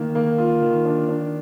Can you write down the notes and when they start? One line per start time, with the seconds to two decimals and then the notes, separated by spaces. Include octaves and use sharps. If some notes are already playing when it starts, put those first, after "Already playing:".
Already playing: D#3 A#3
0.15 A#3
0.38 F4
0.62 D#3
0.85 D4
1.09 D4